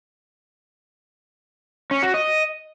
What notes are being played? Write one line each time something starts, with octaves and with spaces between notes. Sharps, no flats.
C#4
F#4
D#5